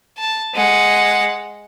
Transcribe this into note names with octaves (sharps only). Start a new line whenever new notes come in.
A5
G#3 F#5